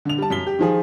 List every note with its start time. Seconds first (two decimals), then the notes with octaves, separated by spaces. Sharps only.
0.05 D3 F7
0.18 G3 A5
0.30 F#2 B6 G7
0.46 G4
0.59 D#3 F3 G#4